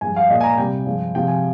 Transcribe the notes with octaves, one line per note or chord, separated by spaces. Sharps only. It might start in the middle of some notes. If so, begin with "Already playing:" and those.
G2 F3 G#3 G#5
F5
A#2 G#3 D#5
G#5
A#5
C3 G3 G5
G2 F3 G#3
C3 F3 G#3 G5
G#5